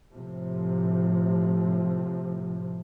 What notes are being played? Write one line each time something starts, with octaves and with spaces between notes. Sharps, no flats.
A2 C3 F3